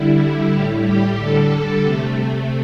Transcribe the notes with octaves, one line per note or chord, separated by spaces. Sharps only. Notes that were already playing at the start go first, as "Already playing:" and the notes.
Already playing: D3 G3 E4
E4
A2 G3 G4
G4
D3 G3 A4
A4
C3 A3